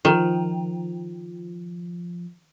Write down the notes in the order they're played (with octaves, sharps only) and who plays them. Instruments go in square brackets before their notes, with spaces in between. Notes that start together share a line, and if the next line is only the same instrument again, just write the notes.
[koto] D#3 [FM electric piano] F3